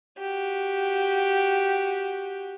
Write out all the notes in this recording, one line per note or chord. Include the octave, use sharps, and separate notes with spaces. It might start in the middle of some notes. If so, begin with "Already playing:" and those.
F#4 G4